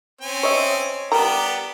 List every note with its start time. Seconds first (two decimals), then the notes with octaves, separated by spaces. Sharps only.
0.21 C4 C#4 G#5
0.43 C#5 D#5 E5
1.12 G3 B3 D4 G4 A#4 A#5